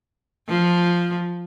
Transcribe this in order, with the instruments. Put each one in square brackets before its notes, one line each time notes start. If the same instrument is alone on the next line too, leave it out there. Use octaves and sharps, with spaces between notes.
[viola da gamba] F3